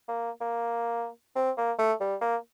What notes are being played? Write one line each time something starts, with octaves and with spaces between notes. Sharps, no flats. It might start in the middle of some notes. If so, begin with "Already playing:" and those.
A#3
A#3
C4
A#3
A3
G3
A#3